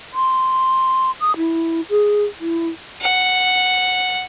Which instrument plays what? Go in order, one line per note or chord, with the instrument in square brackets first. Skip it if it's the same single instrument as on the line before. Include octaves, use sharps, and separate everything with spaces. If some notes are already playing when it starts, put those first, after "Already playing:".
[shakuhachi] C6
D#6
E4
G#4
E4
[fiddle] F#5